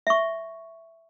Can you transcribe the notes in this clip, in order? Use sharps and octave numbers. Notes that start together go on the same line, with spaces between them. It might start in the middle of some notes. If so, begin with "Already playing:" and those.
E5 C#6